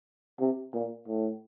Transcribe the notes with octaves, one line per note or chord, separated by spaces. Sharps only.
C3
A#2
A2